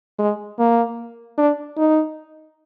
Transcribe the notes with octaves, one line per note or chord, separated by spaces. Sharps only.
G#3
A#3
D4
D#4